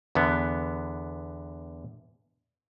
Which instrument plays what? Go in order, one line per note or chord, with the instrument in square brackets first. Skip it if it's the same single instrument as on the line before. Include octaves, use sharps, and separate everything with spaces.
[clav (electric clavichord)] E2 D3 B3